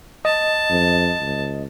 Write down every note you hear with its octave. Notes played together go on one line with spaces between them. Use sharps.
D#5 A5
F2
C#2